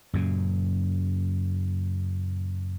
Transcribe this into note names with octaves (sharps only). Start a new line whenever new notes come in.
F#2 A#2 C#3